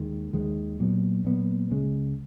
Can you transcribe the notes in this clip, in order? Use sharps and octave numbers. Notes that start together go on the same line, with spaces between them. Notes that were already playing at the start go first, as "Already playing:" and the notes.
Already playing: D#2 D#3 G#3
D#2 D#3 G#3
A#2 F#3 B3
A#2 F#3 B3
C#2 C#3 G#3